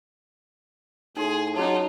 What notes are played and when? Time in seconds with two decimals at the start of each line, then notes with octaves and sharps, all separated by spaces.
1.17 A2 D#4 G#4 C6
1.56 F#3 C#4 D#4 F4 G#4 A5